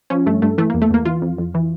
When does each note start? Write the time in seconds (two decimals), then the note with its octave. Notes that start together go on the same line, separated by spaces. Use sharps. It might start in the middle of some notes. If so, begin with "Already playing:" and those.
0.10 F3 C#4
0.26 G2 A3
0.42 G2 A3
0.58 E3 A3
0.70 A#3
0.74 E2
0.82 A3
0.91 E2 A#3
1.05 E3 F4
1.22 F2
1.38 F2
1.54 E3